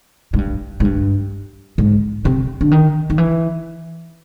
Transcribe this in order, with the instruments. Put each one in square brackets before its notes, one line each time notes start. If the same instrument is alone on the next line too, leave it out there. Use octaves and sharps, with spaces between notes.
[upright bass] G#2
G2
G#2
G2
G#2
C3
D3
D#3
D#3
E3